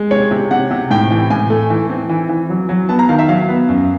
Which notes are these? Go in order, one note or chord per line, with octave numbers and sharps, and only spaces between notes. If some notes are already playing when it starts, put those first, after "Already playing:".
Already playing: G#3
C3 C#5
C3
C3 F#5
C3
A2 G5
E3
A2 G#5
A3
E3
C4
E3
E3
F#3
F#3
B3 A5
A#5
D#3 F5
E5
F#3 F5
B3
F#2